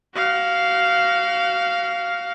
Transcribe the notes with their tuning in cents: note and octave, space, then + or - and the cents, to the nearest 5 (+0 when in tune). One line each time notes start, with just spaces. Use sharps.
F#4 +30 F5 -5